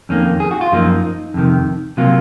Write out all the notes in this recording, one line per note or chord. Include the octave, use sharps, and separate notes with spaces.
F2 D#3 A#3 C#4
G#4
F#4
F4
F#2 F3 A#3 D#4
F2 C3 D#3
C3 F#3 A#3 F4